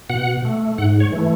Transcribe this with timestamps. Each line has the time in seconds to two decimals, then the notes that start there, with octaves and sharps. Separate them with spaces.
0.10 B2 F#5
0.45 A3
0.78 G#2 F#5
1.00 C#5
1.12 E3 A3